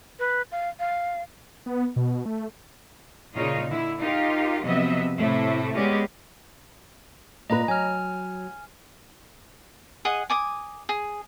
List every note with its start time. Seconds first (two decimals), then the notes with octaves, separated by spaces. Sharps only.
0.19 B4
0.51 F5
0.79 F5
1.66 B3
1.96 B2
2.26 A3
3.33 A#2 C#3 D#4 F4 D#5
3.70 D3 E4
3.99 D#4 F4 G4 A#4
4.62 C3 F3 F#3 B3 D#5 E5
5.18 A2 C3 A3 E4
5.75 G#3 B3 C#4 G4 D5 D#5
7.50 A#2 B4 D#5 A#5
7.68 F#3 G#5 F6
10.05 G#4 D#5 F#5
10.30 G#5 D6 D#6
10.89 G#4